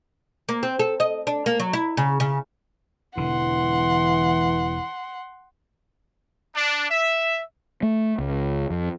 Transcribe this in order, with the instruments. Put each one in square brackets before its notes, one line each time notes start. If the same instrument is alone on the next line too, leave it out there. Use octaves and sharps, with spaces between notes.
[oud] A#3
C4
A4
D#5
D4
A#3
F#3
E4
C#3
C#3
[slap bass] E1 D3 [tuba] E3 [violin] F#5 C6
[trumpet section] D4
E5
[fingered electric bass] A3
C#2
F2